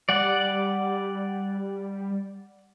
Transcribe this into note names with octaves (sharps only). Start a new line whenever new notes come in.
G3 D5 F#5